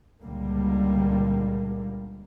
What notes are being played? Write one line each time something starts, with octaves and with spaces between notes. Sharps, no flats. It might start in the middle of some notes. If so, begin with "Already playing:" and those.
C#2 A#2 D3 G3 A#3